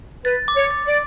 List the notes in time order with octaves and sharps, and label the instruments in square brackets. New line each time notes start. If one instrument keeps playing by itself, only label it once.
[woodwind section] B4 [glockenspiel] A6
[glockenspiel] D6
[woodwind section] C#5
[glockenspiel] A6
[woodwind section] D5